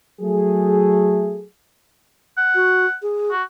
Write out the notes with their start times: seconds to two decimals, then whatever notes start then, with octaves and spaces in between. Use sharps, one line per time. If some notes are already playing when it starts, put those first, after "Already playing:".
0.21 F#3 A3 G#4
2.38 F#5
2.55 F#4
3.02 G#4
3.31 F#4